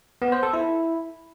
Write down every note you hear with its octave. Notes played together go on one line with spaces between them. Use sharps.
B3
C5
A4
E4